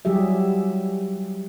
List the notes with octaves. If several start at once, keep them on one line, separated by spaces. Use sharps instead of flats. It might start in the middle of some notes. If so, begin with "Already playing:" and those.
F#3 G3 G4 G#4 E5